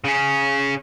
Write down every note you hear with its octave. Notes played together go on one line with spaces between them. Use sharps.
C#3 C#4